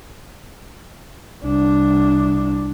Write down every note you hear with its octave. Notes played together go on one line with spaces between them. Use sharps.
C2 D4